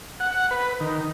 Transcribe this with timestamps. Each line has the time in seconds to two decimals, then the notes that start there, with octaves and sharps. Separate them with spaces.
0.20 F#5
0.51 B4
0.81 D#3